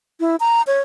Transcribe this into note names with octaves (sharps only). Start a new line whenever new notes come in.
E4
A#5
C#5